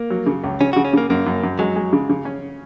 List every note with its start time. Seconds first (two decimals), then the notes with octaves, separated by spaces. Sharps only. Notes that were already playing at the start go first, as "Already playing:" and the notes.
Already playing: A#3
0.10 F#3
0.26 C#3
0.44 C#2
0.61 C#3 C#4
0.73 C#3 F#4
0.85 C#4
0.93 C#3 A#3
1.10 F#2 A#3
1.26 F#2
1.43 F#2
1.59 F#3 G#3
1.76 G#3
1.93 C#3
2.10 C#3
2.25 C#4